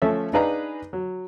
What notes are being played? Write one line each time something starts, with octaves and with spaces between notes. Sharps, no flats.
F3 A3 C#4 A4 E5
D4 D#4 G#4 B4 F5 A#5
F#3